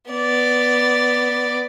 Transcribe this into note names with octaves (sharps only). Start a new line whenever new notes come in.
B3 D5